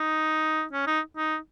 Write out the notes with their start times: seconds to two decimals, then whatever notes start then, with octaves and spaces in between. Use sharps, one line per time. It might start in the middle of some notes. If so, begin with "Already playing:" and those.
Already playing: D#4
0.73 C#4
0.87 D#4
1.17 D#4